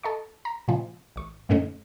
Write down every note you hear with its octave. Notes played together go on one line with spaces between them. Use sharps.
A4 D#5 C#6
A#5
A#2 C#3 F3 G#3
A1 C#6
F#2 A#2 D3 A3 C#4 D#4